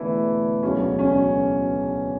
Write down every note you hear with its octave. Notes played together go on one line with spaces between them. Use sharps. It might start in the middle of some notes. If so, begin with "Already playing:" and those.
Already playing: E1 E2 D3 E3 A3 E4
E1 D2 C#3 F#3 C#4
C#4